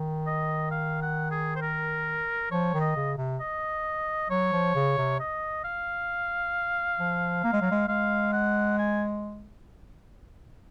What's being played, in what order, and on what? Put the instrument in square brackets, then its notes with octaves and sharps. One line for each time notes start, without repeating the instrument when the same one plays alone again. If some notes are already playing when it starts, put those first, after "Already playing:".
Already playing: [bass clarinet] D#3
[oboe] D#5
F5
F#5
G#4
C5
A#4
[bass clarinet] F3 [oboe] C#5
[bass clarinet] D#3
[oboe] D#5
[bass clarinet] C#3
C3
[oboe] D#5
[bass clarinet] F#3 [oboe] C#5
[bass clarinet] F3
C#3
C3
[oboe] D#5
F5
[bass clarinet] F3
A#3
G#3
F#3
G#3
[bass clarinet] G#3 [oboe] F5
[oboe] F#5
G#5